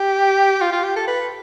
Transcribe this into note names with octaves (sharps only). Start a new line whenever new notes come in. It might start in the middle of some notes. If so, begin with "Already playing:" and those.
Already playing: G4
F4
F4
G4
A4
B4